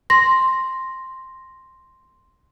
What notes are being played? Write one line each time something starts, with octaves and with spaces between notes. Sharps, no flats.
C6 A#6